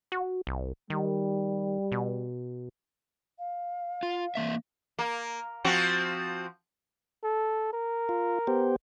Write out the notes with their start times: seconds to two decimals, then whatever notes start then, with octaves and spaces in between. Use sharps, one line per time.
0.12 F#4
0.47 C2
0.90 D#3 G3
1.92 B2
3.39 F5
4.03 F4
4.35 E3 A#3 E5
4.99 A#3
5.64 F3 C4 F#4
7.23 A4
7.73 A#4
8.09 F4
8.47 B3 G4 C5